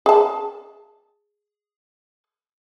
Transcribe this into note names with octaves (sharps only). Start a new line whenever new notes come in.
G#4 A5